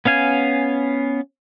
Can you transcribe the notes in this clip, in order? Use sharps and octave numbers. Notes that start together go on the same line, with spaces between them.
B3 C#4 F5 G#5